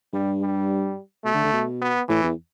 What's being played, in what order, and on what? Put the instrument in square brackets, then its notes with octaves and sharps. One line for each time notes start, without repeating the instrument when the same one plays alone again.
[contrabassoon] G2 [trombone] G3
[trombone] G3
[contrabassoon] B2 [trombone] A3
[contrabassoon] D3
D3
B2
[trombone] B3
[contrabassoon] A2 [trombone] E3
[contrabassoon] E2